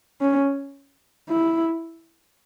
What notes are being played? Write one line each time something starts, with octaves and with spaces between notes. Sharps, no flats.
C#4
E4